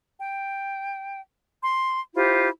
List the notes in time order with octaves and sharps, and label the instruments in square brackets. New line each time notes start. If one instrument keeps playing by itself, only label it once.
[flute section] G5
C6
E4 F4 G4 C5